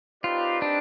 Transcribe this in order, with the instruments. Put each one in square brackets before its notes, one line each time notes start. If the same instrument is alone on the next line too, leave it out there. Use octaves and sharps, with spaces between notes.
[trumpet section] C4 D#4 G4 B4 D5 [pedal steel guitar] F4
[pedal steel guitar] D4